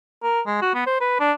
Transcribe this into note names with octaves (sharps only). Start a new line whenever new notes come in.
A#4
G#3
F#4
B3
C5
B4
D4